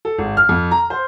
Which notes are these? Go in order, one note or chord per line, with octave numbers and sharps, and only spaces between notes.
A4
G#1
F6
F2
A#5
C5